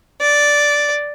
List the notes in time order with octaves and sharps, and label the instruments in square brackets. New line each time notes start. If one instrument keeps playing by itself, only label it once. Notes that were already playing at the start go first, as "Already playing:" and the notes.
[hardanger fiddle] D5